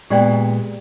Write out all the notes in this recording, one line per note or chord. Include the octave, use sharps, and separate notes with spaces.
A#2 G#3 B3 G4 D5 G5